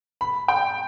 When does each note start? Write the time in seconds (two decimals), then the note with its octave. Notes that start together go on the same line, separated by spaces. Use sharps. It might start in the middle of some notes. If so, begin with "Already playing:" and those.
0.21 B5
0.48 G5